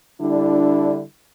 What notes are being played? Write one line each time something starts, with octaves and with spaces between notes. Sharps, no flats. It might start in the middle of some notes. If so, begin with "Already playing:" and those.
D3 G3 D4 E4